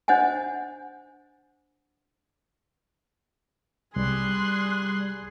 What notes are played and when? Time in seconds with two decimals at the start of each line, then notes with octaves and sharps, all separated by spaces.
0.08 D4 C5 D#5 F#5 G#5
3.96 C2 G3 G#4 C6 F#6